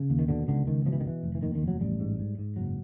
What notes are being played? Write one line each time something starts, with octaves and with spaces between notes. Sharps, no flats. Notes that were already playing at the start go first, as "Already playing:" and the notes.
Already playing: C#3
D#2
D#3
B2 D3
C#2 D3
C#2 D#3
B2 F3
E3
D#3
D3
E3
F1
E3
D#2 D#3
D#3
F1
F#3
A1 G3
G#2
G#2
G#2
F#1 F#3